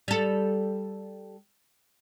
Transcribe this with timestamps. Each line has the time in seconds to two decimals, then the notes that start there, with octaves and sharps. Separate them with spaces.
0.08 G3 A4